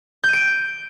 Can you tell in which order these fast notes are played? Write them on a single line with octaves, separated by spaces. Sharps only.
G6 D#7 D7